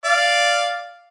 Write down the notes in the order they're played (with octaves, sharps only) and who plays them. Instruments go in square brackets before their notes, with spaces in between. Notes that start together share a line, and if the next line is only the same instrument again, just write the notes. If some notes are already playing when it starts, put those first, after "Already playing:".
[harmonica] D5 F5